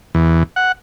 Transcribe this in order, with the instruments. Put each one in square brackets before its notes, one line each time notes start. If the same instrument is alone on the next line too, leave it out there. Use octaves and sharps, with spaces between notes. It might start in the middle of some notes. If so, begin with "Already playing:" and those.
[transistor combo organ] E2
F#5